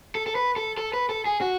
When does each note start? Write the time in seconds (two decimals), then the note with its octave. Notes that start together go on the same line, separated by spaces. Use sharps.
0.15 A4
0.27 A4
0.35 B4
0.56 A4
0.77 A4
0.94 B4
1.09 A4
1.26 G#4
1.41 F#4